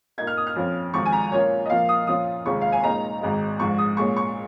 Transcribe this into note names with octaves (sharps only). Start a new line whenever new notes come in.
A#2 A#3 D#4 G#6
F6
D#6
F6
F2 F3 C#4 F4
G#1 G#2 F3 C#6
G#5
A#5
A#2 A#3 C#4 F4 C#5
D#5
A#2 F3 A#3 F5
D#6
A#2 F3 C#4 F4 D#6
F1 D#2 C#3 G#3 F4 C#6
F5
G#5
A#2 G#3 D#4 A#5
G#1 G#2 G#3 D#4
A#1 G#2 F3 C#6
D#6
A#2 G#3 C#4 C#6
C#6